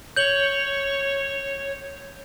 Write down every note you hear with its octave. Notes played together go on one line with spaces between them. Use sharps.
C#5 G6 F#7 G7